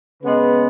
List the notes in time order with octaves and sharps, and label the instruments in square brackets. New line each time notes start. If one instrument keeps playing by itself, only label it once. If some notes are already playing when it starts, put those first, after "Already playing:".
[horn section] C#3 G#3 B3 B4